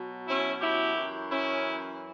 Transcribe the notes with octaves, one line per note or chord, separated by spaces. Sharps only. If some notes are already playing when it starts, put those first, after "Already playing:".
Already playing: B2 F#3
C#4 E4
E4 G4
F#2 E3
C#4 E4